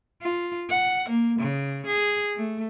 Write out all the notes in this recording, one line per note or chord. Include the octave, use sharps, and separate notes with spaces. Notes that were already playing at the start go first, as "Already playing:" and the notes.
F4
F#5
A#3
C#3
G#4
A3